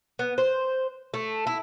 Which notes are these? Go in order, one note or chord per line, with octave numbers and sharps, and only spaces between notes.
B3
C5
A3
E4